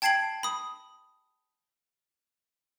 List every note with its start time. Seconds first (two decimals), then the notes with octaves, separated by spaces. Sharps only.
0.02 G5 A5 G#6 C7 D7 F#7
0.43 B5 D#6